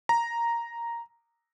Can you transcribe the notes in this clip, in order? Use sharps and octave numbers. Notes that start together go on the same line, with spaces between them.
A#5